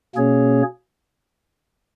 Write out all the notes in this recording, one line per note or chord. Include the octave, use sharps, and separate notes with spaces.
B2 A#3 C#4 G#4 C#5